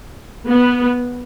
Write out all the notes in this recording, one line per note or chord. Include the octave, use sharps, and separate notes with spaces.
B3